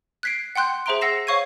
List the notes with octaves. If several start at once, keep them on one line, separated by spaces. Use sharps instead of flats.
F#6 G#6 B6 C7 D7
F#5 G5 C6 F#6 G6
G#4 C5 E5 A#5 C6 D7
F#5 E6 A#6 C7 E7
C5 C#5 F5 C#6 G#6 D#7